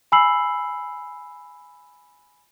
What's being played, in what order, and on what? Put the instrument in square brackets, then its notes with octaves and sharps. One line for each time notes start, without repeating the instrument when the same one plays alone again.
[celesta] G#5 B5 E6 C7 F#7